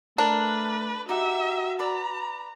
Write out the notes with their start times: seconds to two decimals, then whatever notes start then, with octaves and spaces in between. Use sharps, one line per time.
0.18 A3 D4 A#4 B4
1.09 D#4 F#4 G4 E5 F#5
1.79 B4 D5 A#5 B5